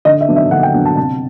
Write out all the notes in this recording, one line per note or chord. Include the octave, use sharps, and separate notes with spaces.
D3 D#5
E5
F#3 B3 D4
E5
D3 F#5
G5
F#3 B3 D4
A5
C3 A5